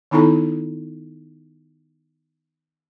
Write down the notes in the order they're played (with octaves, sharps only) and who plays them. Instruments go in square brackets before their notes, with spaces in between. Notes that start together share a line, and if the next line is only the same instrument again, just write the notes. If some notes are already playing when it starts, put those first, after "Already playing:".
[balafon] D#3 B3 D#4 E4 A4 A#5